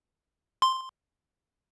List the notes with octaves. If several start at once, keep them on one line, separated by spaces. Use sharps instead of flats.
C6